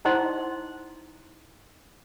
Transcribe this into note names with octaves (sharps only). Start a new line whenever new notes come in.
D#4 E4 C5 D#5 F#5 C6